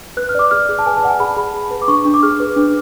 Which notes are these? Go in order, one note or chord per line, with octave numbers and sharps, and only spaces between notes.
B4 F#6
F6
D5 D6
G#4 F6
G#4
A5
B4 G#5
A5
D5 F#5
G#5
G#4 B5
A5
G#4 B5
G#4
B4
D6
D4 C#6
D4
D6
G#4 F6
B4
D4